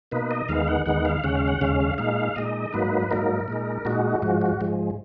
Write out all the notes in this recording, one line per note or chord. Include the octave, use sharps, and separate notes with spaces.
B2 A#3 D#4 B4
D#5
D#2 D#3 G#3 B3 D#4 F5
F#5
D#2 D#3 G#3 B3 D#4 F#5
F5
D#2 C#3 G#3 C#4 F#5
F5
F#5
D#2 C#3 G#3 C#4 F5
F5
A#2 G#3 D#4 F5
A#2 G#3 D#4 D#5
G#2 F#3 A#3 D#4 B4
G#2 F#3 A#3 D#4 A#4
A#2 G#3 D#4
A#2 G#3 D#4 F#4
G#2 F3 G#3 F#4
F#4
G#2 F3 G#3